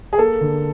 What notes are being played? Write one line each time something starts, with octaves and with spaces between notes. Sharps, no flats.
G#4
A#3 A4
D3